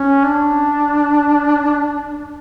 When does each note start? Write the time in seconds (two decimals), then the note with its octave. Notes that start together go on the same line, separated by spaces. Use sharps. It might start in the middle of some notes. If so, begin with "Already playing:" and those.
Already playing: C#4
0.25 D4